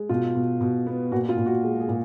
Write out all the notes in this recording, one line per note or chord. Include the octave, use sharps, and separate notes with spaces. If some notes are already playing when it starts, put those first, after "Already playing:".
Already playing: G#3
B2 F4
B2
B2
B3
A#2 F#4
F4
A#2
F#4
G#3
G#4
A#2